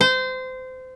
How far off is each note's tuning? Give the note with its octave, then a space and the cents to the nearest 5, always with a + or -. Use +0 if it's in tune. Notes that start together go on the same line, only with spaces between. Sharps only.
C5 -25